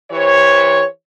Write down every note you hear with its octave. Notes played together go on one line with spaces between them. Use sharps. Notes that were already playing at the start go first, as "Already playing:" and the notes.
E3 G4 C5 C#5